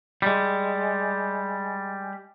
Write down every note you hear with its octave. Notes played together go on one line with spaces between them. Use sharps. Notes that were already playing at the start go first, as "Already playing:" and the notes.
G3 G#3